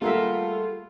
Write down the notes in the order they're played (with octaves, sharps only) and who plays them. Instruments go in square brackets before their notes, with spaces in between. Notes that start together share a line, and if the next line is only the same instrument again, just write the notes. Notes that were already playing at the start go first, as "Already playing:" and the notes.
[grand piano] G3 G#4 F#5 [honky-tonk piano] A3 [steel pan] A#3 A#4 E5 [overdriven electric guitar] F4